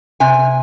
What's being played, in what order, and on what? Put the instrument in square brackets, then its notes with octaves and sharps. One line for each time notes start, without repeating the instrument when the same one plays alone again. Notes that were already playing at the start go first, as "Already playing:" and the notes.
[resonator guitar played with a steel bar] C3 G#5